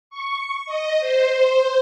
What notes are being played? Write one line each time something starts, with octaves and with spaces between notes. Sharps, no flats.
C#6
D#5
C5